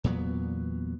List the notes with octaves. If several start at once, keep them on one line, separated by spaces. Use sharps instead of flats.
E2 A#2 F#3 B3